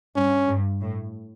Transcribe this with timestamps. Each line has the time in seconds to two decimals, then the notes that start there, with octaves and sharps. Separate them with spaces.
0.16 G2 C#4
0.47 G2
0.81 A2